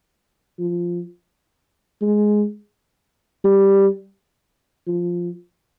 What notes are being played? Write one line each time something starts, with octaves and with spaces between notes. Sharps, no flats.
F3
G#3
G3
F3